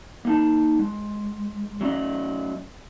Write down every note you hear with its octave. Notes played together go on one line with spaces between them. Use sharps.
A#3 D#4 A5
G#3
F#3 A3 C#4 D5 D#5